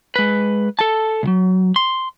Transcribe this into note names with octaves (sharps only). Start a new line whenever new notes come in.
G#3 B4
A4 A5
C2 F#3
C6